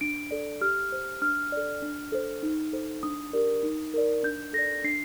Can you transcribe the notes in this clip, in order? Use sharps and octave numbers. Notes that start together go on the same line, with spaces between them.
D4 D7
A4 D5
G4 F6
C5
D4 F6
A4 D5
D4
A4 C5
D#4
A4 C5
D4 D#6
G4 A#4 D5
D#4
A#4 D5
D4 G6
A4 D5 A#6
D4 C7